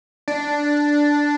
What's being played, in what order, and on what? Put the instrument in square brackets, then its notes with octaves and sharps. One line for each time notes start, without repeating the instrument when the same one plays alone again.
[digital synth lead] D4